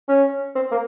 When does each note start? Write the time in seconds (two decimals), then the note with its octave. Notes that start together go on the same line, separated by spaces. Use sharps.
0.08 C#4
0.55 C4
0.71 A#3